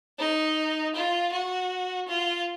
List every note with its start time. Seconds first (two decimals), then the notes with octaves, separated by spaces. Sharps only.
0.19 D#4
0.95 F4
1.32 F#4
2.07 F4